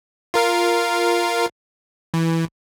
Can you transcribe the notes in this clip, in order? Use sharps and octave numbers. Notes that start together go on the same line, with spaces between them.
F4 A#4 F5
E3